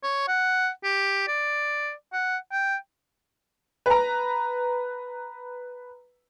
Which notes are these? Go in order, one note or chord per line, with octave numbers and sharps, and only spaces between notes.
C#5
F#5
G4
D5
F#5
G5
B4 A#5